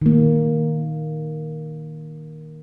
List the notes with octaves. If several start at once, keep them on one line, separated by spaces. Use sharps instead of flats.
D#3 A#3